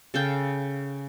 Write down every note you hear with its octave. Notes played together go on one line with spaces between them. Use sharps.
C#3 A4 F5 G5